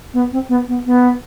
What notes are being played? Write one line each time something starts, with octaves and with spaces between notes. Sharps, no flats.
B3
C4
B3
B3
B3